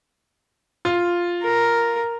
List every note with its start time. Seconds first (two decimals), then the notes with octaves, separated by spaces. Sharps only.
0.85 F4
1.42 A#4